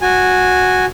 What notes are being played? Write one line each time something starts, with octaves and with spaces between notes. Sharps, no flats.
F#4 G#5